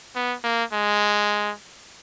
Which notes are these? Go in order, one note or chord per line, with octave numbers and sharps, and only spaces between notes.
B3
A#3
G#3